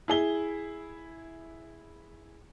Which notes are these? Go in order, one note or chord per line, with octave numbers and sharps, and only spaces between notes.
E4 G#4 G7